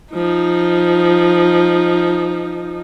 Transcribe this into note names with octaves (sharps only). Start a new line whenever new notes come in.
F3 D#4